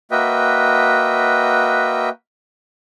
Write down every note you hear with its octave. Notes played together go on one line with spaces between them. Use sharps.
A#3 F#4 B4 D#5 E5 G5